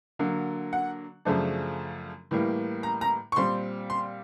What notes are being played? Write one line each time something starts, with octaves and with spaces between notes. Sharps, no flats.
D3 F#3 A#3
F#5
F#2 C#3 F3 A3 D4
A2 E3 G3 A#3
A#5
A#5
C#6
A#2 G3 C4 C6
C6